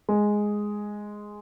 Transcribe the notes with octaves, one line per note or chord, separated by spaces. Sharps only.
G#3